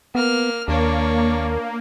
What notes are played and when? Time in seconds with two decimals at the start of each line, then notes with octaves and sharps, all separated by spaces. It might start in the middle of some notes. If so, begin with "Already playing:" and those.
0.15 A#3 B3 F6
0.68 D#2 A#3 D4 C#5